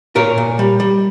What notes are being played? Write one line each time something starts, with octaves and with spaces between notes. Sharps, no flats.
A#2 A#4 C#5
A#2
G3
G3